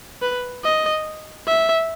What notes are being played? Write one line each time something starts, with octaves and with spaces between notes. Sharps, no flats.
B4
D#5
E5